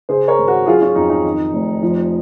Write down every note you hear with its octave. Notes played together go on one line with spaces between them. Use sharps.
C#3 G#4 C5
A#4 C#5
G#1
F#4 A#4
F#3 F4 G#4
C#4 F4
F2 D#4
D#4
D#3
F1
F3